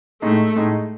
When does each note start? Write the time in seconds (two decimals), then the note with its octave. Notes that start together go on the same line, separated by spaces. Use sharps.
0.22 A2 G#3 A3 D#4
0.56 A2 G#3 D#4